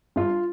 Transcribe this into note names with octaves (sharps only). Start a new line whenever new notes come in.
G2 F4